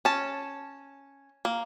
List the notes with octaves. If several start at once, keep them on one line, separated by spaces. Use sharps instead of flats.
C#4 A5
A#3